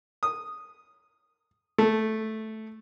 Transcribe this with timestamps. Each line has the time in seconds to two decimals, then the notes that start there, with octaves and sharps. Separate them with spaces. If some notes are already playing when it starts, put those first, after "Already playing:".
0.23 D#6
1.78 A3